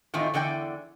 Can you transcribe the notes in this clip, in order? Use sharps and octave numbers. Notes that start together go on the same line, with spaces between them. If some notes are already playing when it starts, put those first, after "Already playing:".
A2 D#3 E3 C4 D#4 F4
E2 D3 E3 D5 G5